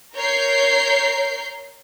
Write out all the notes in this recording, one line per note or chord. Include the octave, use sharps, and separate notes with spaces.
A#4 C#5 G6 C7